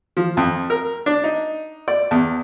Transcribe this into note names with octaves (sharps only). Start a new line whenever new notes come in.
F3
F2
A#4
D4
D#4
D5
E2